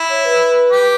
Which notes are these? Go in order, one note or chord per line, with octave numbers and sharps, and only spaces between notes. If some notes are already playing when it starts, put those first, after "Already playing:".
Already playing: E4
C#5
B4
G4